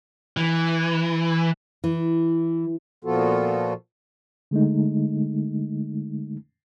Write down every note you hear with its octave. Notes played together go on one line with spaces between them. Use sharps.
E3
E3
A#2 F3 B3 F4 F#4 A4
D3 G#3 A3 D#4